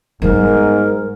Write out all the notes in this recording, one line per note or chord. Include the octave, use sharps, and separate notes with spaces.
G#2 G3 B3 A#4